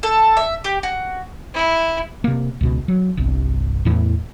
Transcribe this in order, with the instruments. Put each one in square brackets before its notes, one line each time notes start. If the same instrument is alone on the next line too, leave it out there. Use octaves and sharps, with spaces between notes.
[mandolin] A4
E5
G4
F#4
[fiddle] E4
[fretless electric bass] C3 A#3
C#2 B2
F#3
G1 C2 G2
E2 A2 E3